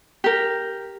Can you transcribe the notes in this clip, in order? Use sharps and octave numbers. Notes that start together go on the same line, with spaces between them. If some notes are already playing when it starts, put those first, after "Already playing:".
G4 A#4